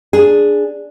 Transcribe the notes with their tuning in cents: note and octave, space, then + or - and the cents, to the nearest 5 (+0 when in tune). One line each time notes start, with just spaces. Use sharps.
D4 +0 G#4 +0